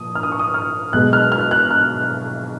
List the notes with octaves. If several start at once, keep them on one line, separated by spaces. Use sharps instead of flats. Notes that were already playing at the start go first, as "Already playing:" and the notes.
Already playing: A#2 F3 D#6
F6
D#6
C#6
D#6
F6
B1 B2 G#3 F#6
F6
F6
F#6
F6